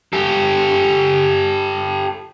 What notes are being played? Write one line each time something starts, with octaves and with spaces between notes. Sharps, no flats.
G4 A4